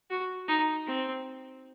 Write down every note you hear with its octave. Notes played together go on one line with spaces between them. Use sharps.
F#4
D#4
C4